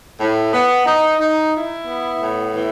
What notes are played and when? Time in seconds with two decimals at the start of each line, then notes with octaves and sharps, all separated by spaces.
0.20 A2
0.53 B3
0.86 D#4
1.20 D#4
1.53 E4
1.87 B3
2.21 A2
2.54 E3